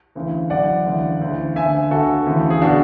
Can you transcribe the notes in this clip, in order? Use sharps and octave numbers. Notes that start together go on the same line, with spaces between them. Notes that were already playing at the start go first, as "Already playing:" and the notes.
D2 C#3 E3
F#2 E3 D5 F#5
D2 C#3 E3
D2 C#3 E3
D2 D3 E5 G#5
D2 D3 F#4 A4
D2 C#3 E3
G#4
B2 D4 F#4